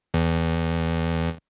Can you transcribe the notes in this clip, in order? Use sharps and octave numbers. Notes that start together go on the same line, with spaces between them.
E2